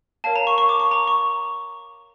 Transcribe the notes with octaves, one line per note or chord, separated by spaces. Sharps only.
A#4 C#5 F5 A5
A#5
C#6
C#6
D6
C#6
A#5
C#6